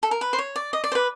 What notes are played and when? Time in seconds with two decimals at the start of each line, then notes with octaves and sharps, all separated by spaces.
0.03 A4
0.11 A#4
0.21 B4
0.33 C5
0.38 C#5
0.56 D5
0.73 D#5
0.84 D5
0.92 C5
0.95 B4